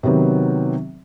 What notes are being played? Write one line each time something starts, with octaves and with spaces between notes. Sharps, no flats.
C3 D#3 F#3 B3